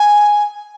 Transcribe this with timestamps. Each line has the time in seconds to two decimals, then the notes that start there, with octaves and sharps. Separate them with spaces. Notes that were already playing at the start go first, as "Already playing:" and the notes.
Already playing: G#5